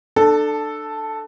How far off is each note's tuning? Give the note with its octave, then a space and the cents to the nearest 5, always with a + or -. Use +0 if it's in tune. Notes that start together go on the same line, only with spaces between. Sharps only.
D4 +30 A4 +0